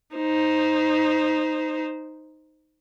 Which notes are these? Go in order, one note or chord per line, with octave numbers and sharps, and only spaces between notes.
D#4 C5